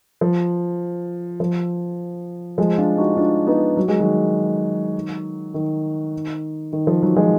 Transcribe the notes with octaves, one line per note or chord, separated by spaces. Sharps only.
F3
F3
F3 G#3
D4 F4
D#4 F#4
D4 F4
B3 D#4
F#3
G#3
D#3 F#3
D#3
D#3
F3
D#3 F#3
F3 G#3